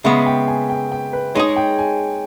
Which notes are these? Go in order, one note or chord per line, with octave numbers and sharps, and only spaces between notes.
C#3 G#3 B3 E5
G5
G#5
G5
G5
B4
G#3 D#4 G#4 C#5
G5
G#5